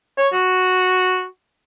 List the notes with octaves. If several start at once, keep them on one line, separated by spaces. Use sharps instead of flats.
C#5
F#4